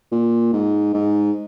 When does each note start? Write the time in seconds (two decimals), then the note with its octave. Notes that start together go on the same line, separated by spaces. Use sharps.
0.12 A#2
0.53 G#2
0.94 G#2